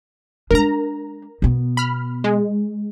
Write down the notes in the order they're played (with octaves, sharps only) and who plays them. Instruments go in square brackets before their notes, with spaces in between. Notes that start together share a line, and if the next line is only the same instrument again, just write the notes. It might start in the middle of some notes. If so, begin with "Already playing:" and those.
[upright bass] G#3 D4 [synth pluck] A#4 A#5
[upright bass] B2 B3
[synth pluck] B5 F6
G#3